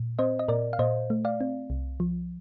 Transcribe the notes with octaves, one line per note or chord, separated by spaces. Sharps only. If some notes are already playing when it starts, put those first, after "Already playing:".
Already playing: A#2
C4 C5 D#5
D#5
A#2 A#4 D5
F5
A#2 C5 D#5
A3
D5 F5
C4
C2
F3